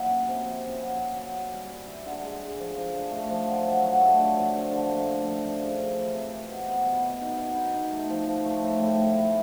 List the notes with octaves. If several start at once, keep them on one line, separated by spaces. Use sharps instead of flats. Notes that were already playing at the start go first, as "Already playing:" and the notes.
Already playing: F#3 A#3 E4
C#4
C3
F3
C#4
F#3
F#3
F#3
C#4
G3
G3
E4
D3
G#3
G#3
F3
F3
D4
A3
F3
D3
F#3
F#3
A3
D3
F3
D3
D3
A#3
A3
F3
F3
C#3
A3
E3
C3
C3
B2
B3
B2
B2
D#4
B2
D#4
D#4
A3
F3
F3
A3
A2
A2
A2
A2